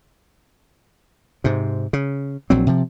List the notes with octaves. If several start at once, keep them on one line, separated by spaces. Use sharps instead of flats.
G#2 C3
C#3
A#1 F#3 C4
C3 F3